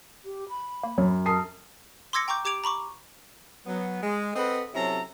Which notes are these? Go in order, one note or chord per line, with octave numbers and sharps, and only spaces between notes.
G4
B5
A#3
F#2 F#3
A#4 A5 D#6 C7
C6 D6 E6 G#6 A#6 C#7
G5 A#5 C#6 D6 G6
G4 D6 G#6 D7 F7
A#5 B5 C#6 D6
F#3 B3
G#3
C4 A4 B4 D#5 F#5 B5
C3 F#3 C#4 E4 A4 A#5